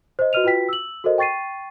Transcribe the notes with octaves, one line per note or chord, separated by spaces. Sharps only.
C5 D#5
F#4 B4 D#5 F6 D#7 F7
F4 F#4 B4 G5 B6
E6 F#7
F#4 A4 A#4 C5 D#5
G5 C#6 A6 C7 D#7